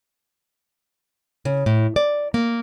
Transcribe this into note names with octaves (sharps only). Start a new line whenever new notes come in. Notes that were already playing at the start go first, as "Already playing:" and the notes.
C#3
A2
D5
A#3